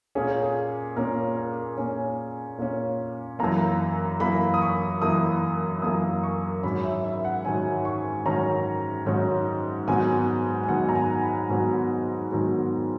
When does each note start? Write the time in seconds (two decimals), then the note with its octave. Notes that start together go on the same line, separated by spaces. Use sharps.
0.15 A#2 A#3 C#4 G#4
0.43 G#4
0.96 A#2 A#3 C#4 A#4
1.37 A#4
1.77 A#2 A#3 C#4 G#5
2.58 A#2 A#3 C#4
3.39 F#2 E3 A#3 A#5
4.20 F#2 E3 A#3 B5
4.54 D#6
4.62 C#6
5.02 F#2 E3 A#3 D#6
5.82 F#2 E3 A#3 D#6
6.23 C#6
6.63 G#2 D#3 F#3 C#4 B5
6.84 E5
7.04 E5
7.25 F#5
7.45 G#2 D#3 F#3 C#4 G#5
7.85 C#6
8.26 G#2 D#3 F#3 C#4 A#5
9.06 G#2 D#3 F#3 C#4
9.88 G#2 D#3 F#3 B3 G#5
10.63 G#5
10.68 G#2 D#3 F#3 B3 F#5
10.89 A#5
10.95 G#5
11.22 B5
11.49 G#2 D#3 F#3 B3
12.31 G#2 D#3 F#3 B3